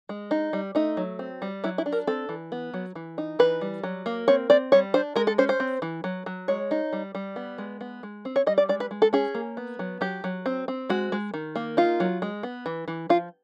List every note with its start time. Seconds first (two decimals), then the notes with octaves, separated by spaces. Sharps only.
0.09 G#3
0.31 D#4
0.53 G3
0.75 A3 D#4
0.97 F#3
1.19 C4
1.42 G3
1.64 F#3 E4
1.78 E4
1.86 D4
1.92 A#4
2.07 C4 A4
2.29 E3
2.52 B3
2.74 F#3
2.95 E3
3.18 D#4
3.39 E3 B4
3.61 G3
3.83 F#3
4.06 A#3
4.28 C4 C#5
4.50 C4 D5
4.72 G3 C#5
4.94 D4 C5
5.16 G#3 A#4
5.27 A4
5.38 C#4 C5
5.49 C5
5.60 C4
5.82 E3
6.04 F#3
6.26 F#3
6.48 G#3 C#5
6.71 D#4
6.93 G3
7.15 G3
7.36 B3
7.58 G#3
7.81 B3
8.03 G#3
8.25 C4
8.36 C#5
8.47 G3 D#5
8.58 D5
8.69 G#3 D5
8.80 B4
8.91 G#3
9.02 A4
9.13 C#4 G#4
9.35 A#3
9.57 B3
9.79 F#3
10.01 F#3 G4
10.24 F#3
10.46 C4
10.68 C4
10.90 G#3 F#4
11.12 G#3
11.34 D#3
11.56 A#3
11.77 D#4 F4
12.00 F#3
12.22 G#3
12.43 B3
12.66 E3
12.88 E3
13.09 F3 F4